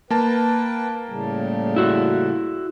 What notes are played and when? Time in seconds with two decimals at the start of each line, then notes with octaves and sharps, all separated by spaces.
0.11 A#3 B4 G5 A5
1.09 A2 C#3 G3
1.76 E4 F#4